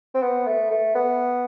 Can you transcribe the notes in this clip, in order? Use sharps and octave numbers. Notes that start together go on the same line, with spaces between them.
C4
B3
A3
A3
B3